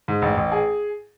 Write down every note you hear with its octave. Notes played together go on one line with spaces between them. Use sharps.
G#2
A1
A1
G#4